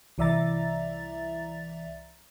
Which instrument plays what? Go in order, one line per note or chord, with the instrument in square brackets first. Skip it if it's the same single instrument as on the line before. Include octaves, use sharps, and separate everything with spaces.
[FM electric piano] C2 E3 D5 E5 A#5 A6